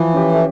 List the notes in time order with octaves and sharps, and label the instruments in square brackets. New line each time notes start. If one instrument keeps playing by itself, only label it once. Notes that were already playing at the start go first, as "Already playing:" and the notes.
Already playing: [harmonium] E3 [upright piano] F3
[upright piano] C#4 G4
[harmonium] A3